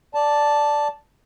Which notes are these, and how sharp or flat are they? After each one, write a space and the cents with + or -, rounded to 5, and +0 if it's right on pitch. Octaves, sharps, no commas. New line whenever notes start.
D5 +0 A5 +0